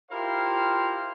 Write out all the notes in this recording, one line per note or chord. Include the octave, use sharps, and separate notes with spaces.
E4 F4 G4 A#4 C5 F5